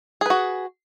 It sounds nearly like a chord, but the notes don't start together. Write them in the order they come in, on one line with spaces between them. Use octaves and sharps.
G#4 B4 F#4